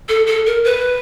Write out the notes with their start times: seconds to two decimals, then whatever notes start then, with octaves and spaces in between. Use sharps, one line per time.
0.09 A4
0.27 A4
0.46 A#4
0.65 B4